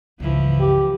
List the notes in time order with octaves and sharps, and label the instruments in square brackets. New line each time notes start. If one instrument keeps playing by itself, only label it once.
[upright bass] C#2 G2 [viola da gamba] E3 F3
[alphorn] G4